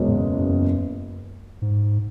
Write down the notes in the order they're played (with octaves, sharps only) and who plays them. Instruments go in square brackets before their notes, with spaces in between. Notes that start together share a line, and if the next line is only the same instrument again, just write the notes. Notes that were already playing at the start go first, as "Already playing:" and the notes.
Already playing: [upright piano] F#1 E2 B2 G#3 C#4
[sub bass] G#2
F#2
G#2